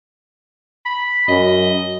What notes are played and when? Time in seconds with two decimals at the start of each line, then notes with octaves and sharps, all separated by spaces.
0.86 B5
1.28 F#2 D#5